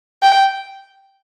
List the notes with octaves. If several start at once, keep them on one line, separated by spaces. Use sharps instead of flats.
G5